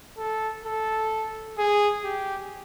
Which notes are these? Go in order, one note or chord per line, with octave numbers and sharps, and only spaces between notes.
A4
A4
G#4
G4